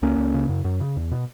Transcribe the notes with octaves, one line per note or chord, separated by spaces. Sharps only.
C#2 A#3 C#4
C#2
C#3
F#2
F#2
C#3
E2
B2